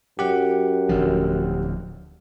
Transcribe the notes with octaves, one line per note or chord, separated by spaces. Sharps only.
F#2 G4 F#5
D1 D2 F3